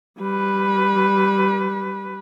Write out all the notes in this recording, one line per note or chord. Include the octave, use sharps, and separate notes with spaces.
G3 B4